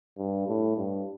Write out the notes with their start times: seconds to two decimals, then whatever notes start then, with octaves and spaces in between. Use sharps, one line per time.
0.18 G2
0.48 A2
0.76 G2